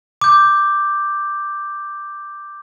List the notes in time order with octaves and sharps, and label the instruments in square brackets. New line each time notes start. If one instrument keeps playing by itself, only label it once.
[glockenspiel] D6 G6